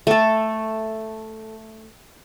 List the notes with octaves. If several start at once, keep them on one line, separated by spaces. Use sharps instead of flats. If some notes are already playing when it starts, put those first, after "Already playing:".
A3 A4